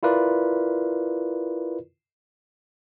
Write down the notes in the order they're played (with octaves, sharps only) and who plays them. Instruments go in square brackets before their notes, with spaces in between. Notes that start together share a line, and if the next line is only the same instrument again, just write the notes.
[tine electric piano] E4 F4 A#4 B4 D5